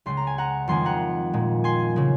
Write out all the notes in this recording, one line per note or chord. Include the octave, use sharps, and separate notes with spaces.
C#2 C#3 G#3 C6
A#5
G#5
F#5 A#5
F2 D#3 G#3 G#5 C6
F#5 A#5
A#2 G#3
G#5 C6
C#3 G#3